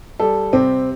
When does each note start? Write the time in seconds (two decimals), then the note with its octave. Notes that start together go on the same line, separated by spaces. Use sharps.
0.20 G3 A4
0.53 C3 C4